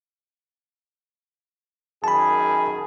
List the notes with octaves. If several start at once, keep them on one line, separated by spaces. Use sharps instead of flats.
F#2 D#3 G#4 A5 B5